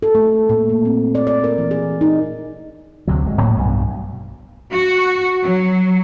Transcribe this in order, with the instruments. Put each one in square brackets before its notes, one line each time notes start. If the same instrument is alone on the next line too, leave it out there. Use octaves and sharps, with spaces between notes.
[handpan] A4
A3
A#2
A#3
C4
D5
D5
A#4
E3
G#4
D#4
[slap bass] D2 C3 F#3
G#1 G#3
G#2 F#3 A#3
B1 G2 B2
[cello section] F#4
F#3